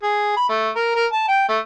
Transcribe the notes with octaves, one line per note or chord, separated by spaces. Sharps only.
G#4
B5
A3
A#4
A#4
A5
G5
A3